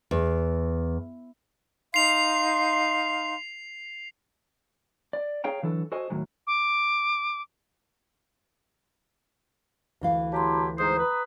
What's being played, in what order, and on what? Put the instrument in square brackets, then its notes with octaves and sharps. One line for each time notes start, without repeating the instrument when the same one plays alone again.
[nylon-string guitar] E2
[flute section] D#4 F5 C6 [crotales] C7 F7
[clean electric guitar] D5
G#4 C#5 F5 G5 A#5
D3 E3 F#3 A4
F#4 A4 C5 D#5 G#5
D#2 A2 D#3 F#3
[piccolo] D6
[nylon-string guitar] D2 E3 F5
[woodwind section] F#3 E4 G4 [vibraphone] A5 A#5 C6
[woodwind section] G#2 G#3 C5 [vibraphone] A#5 D#6
[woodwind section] B4